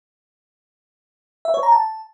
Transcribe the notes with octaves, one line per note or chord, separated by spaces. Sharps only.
E5
C#5
A#5
A5